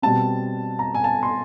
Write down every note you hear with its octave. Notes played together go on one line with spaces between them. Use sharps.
B2 G3 C4 A5
A#5
G#5
A5
C6